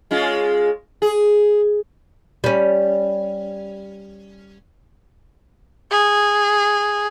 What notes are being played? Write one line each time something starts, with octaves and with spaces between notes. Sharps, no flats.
G#3 C#4 F4
G#4
G3 C#4
G#4